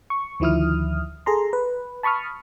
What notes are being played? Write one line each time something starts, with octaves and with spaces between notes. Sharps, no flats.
C#6
D2 D#3 F3 E4 D#6 F6
G#4 A4 A#5 C6
B4
A5 B5 C#6 D#6 F6